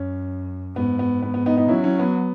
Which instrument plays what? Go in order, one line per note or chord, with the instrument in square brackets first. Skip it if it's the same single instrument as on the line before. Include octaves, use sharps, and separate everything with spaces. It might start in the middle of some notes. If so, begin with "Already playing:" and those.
Already playing: [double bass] F#2 [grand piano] C#4
[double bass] G#2 [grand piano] B3
[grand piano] B3
B3
B3
B3 D#4
B3 D#4
[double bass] F#3 [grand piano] C#4 E4
[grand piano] C#4 E4
B3